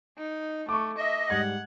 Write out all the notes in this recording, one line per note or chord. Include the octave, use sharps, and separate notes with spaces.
D#4
A3 C#6 D6
D#5 E5
G#2 G3 F#5 G#6